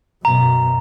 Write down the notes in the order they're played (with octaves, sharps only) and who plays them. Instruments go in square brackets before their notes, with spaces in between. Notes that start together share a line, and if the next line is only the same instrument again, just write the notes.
[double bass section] F#2 B2 [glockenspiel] A#5